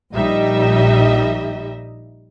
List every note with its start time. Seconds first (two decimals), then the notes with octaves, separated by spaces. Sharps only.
0.14 A#1 G3 D#4 D#5 E5